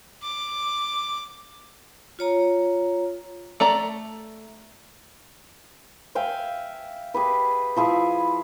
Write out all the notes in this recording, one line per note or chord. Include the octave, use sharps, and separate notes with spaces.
D6
F4 C#5 A#5
A3 D5 A#5
E5 F5 G5 G#5
G4 G#4 B4
F3 E4 G#4